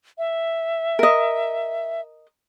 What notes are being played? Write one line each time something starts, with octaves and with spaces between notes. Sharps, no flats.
E5
A#4 D#5